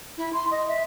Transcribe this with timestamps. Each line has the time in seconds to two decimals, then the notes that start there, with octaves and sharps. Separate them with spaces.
0.17 E4
0.32 C6
0.50 D#5
0.67 E5